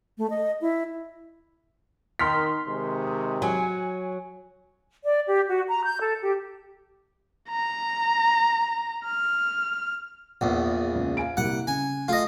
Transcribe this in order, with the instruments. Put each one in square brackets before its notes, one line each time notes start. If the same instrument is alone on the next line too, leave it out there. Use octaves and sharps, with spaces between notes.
[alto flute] A3
D#5
E4
[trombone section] D#3 [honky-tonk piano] C6 F6 B6
[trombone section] C3 D#3 G#3
[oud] F#3 [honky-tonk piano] G#5
[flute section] D5
G4
F#4
A#5
G6
A4
G4
[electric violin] A#5
F6
[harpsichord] A#1 E2
[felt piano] C#2
F5 G#5 D7
[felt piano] C2 G3 A#3 [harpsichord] F#5
[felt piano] C#3 [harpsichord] G#5
[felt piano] A3 [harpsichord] F4 D#5